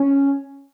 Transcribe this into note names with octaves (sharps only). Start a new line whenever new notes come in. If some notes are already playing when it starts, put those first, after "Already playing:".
Already playing: C#4